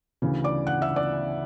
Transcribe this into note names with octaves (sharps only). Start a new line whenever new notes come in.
D2 C#3 E3
D5 D6
F#5 F#6
E5 E6
D5 D6